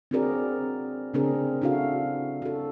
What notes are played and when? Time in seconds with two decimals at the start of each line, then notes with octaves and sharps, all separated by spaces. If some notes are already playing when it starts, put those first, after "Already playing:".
0.11 C4 D4 F#4 G#4 A#4 D5
1.14 C#3 A3 C4 D4 G#4 A#4
1.62 D4 E4 F#4 A4 F5
2.42 F#4 A4